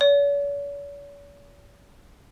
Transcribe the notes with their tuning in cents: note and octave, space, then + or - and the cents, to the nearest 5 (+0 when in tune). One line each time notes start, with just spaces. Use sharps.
C#5 +45